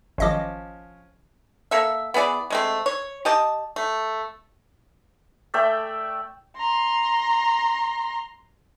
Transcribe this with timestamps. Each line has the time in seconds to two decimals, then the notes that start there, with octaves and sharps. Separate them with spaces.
0.18 G#1 F3 C#4 D#5 D6
1.71 A#3 A4 E5
2.14 B3 E4 G#4 D5
2.50 G#3 A3 C4
2.86 C#5
3.25 G4 D#5 A5
3.76 A3
5.54 A3 D5 E5 G5
6.57 A#5 C6